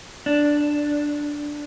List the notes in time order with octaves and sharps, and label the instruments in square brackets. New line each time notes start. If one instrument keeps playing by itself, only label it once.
[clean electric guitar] D4